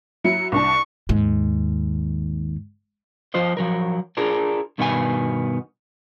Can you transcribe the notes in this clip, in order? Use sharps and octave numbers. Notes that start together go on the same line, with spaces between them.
F#3 E4 C#7
C2 D4 A5 C#6
D#2 G#2
F3 F4 C5 D#5
F3 F#3 A#4
D4 F4 G#4 A#4
G2 B2 D#3 B3 G#4 G#5